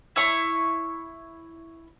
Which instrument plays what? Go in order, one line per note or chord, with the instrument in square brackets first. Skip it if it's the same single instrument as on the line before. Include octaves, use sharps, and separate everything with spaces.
[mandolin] E4 C#5 C#6